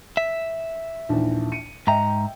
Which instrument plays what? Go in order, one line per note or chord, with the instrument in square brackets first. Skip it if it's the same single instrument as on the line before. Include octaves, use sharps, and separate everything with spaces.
[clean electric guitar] E5
[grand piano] A#1 D#2 E3
C#7 D#7
[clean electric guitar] G#2 A#5 [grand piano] D#5 E5 G5